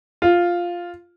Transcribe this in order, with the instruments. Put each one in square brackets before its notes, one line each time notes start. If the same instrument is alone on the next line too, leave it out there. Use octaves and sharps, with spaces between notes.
[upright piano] F4